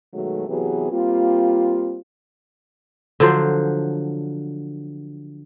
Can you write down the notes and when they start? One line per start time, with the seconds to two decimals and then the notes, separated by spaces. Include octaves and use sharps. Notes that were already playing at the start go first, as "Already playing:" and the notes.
0.13 B2 D#3 F#3 G#3 A3
0.48 C3 E3 F#3 B3 G4 G#4
0.91 G3 A#3 C4 F4
3.20 D3 F3 F#3 C5